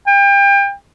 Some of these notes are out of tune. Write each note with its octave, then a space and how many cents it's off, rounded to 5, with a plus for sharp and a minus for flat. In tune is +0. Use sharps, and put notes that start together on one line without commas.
G5 +30